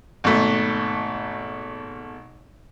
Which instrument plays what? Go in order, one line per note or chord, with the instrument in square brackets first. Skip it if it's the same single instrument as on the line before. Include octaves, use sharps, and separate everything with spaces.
[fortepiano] G#1 B2 A3